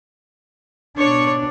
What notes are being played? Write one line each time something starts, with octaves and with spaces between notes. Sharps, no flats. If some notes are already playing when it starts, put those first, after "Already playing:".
B2 D4 C#5 C#6